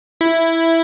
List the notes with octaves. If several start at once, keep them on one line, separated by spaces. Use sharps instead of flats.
E4